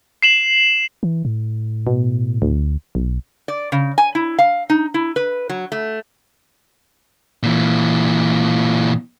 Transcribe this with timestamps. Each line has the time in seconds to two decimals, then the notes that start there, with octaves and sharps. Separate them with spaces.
0.23 C7 E7 F#7
1.03 E3
1.25 A2
1.87 B2
2.42 D2
2.95 B1
3.48 D5
3.72 C#3
3.98 G#5
4.15 E4
4.39 F5
4.70 D#4
4.94 E4
5.16 B4
5.49 F#3
5.72 A3
7.43 A#2 E3